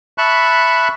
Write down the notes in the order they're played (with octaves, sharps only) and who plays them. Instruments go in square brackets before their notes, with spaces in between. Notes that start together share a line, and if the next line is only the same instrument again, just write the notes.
[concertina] E5 A5 B5 C#6 F#6